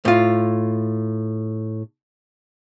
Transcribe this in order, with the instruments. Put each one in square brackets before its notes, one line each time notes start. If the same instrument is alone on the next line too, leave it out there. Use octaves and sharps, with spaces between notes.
[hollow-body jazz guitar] A2 F4